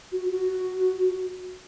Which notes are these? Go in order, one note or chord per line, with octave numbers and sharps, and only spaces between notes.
F#4
F#4